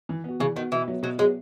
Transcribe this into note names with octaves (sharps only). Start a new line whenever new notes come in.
E3
B3 F#4
C#3 E3
D#3 B3 F#4
B2 E3
F#3 B3
B2 F#3
F#3 G#3 B3